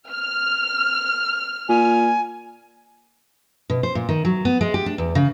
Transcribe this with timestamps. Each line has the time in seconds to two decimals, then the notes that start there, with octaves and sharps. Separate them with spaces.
0.11 F6
1.69 A#2 G#5
3.70 B2
3.83 C5
3.95 A#2
4.09 D#3
4.25 F#3
4.45 B3
4.61 G#3
4.74 G4
4.86 D4
4.98 E2
5.15 C#3